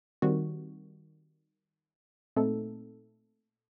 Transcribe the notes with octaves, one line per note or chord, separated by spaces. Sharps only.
D#3 G3 C4 F#4
A#2 A3 C4 D#4 A4